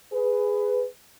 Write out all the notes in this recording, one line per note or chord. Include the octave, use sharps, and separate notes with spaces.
G#4 B4